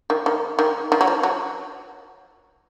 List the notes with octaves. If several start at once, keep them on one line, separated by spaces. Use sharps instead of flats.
D#3
D#3
D#3
D#3
F#3
F3
F#3